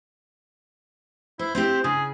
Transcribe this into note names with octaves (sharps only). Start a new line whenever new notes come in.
E4 C5
C4 E4 G4 C5
C#3 G#4